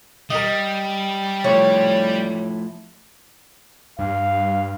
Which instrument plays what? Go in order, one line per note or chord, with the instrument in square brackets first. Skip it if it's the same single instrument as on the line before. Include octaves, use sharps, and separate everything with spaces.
[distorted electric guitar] G3 [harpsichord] A#4 D#5
[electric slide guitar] F3 A3 E4 [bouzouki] C#5
[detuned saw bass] G2 [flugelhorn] F5